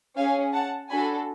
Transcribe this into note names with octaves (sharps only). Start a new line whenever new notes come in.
C#4 G#4 F5 G#5
F#5 A5
D4 F#4 A4 G#5 B5